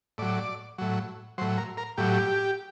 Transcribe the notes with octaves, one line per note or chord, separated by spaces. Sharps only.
A2 F#3 D5
A2 F#3
A2 F#3 C5
A#4
A#4
A2 F#3 G4